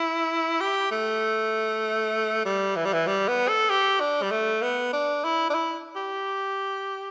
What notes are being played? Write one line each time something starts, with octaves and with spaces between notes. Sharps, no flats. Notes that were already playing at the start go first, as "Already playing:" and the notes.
Already playing: E4
G4
A3
G3
E3
G3
E3
G3
B3
A4
G4
D4
G3
A3
B3
D4
E4
D4
E4
G4